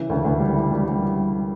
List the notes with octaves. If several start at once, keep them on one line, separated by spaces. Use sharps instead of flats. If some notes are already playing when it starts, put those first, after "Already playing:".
Already playing: C#3 E3
D2
D2
G3
E3
G3
G3